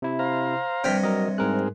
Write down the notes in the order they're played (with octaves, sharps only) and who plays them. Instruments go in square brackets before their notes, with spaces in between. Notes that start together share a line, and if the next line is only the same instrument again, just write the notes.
[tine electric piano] C3 E4
[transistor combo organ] C5 F5 A#5
[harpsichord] G2 C3 [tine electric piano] G5 F6 B6
[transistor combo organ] F#3 [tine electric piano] A#4 D#5
[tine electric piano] G#2 A#4 F#6 [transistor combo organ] C4 G#4